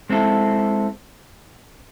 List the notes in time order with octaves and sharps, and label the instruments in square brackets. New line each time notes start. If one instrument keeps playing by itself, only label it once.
[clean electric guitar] G#3 C4 E4 A4